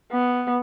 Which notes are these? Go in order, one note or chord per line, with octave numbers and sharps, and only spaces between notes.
B3